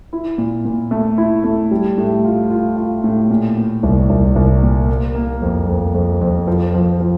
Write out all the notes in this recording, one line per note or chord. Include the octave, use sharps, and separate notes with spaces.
E4
A#2
A#2
A3
E4
A3
G3
A2
F4
F4
F4
A2
A#2
A#2
C2
C2
C2
A#2
A#3
A#3
F2
F2
F2
F2
F3
F3
F3